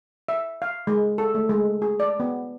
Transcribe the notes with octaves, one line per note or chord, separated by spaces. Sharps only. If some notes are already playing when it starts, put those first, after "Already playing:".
E5
F5
G#3
A4
A3
G#3
G#4
D5
B3